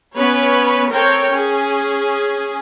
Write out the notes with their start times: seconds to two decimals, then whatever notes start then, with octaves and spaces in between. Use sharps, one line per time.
0.17 B3 C#4 B4 C#5
0.92 C4 A4 A#4 C#5 G5
1.30 C#4 G#4